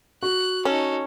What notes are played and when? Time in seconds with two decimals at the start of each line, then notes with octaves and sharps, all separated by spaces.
0.22 F#4 F#6
0.65 C#4 D#4 A4